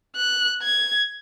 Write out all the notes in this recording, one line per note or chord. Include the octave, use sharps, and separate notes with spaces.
F#6
G#6